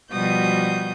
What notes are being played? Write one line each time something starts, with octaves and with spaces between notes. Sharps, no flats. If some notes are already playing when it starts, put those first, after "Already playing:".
B2 F3 G3 F#4 D#6 G6